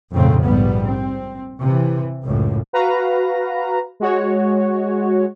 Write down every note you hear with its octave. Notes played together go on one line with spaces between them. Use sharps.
A#1 F2 G#2 C#3 A3 C4
A#1 G#2 G3 B3
C4
C3 E3
C#2 F#2 A2
F#4 B4 F5 A#5
G#3 F#4 C#5